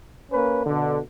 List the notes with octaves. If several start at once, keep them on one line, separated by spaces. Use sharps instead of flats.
A#3 C#4 B4
B2 D3